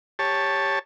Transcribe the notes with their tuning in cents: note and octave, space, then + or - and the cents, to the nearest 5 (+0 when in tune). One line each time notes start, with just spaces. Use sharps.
G4 +15 C#5 +0 A5 +0